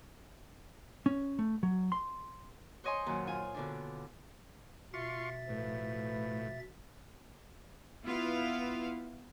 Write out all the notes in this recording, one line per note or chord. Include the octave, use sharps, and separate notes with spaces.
C#4
A3
F#3
C6
C5 C#5 D#5 G#5 C6 C#6
F#2 A#2 D#3
F4 G#5
B2 D3 D4
B2 F4 E5 C6 C#6 A6
A2 F3 A3 B4
B3 E4 F4 B4 F5